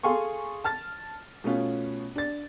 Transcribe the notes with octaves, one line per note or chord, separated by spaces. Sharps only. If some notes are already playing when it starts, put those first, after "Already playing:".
G#4 A4 F5 G#5 C6 C#6
A5 F6 A6
B2 A3 B3 C#4 F4
D4 A6